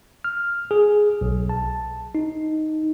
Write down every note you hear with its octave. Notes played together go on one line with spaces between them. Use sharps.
F6
G#4
B1
A5
D#4